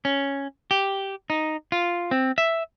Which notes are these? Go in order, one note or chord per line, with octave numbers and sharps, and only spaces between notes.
C#4
G4
D#4
F4
C4
E5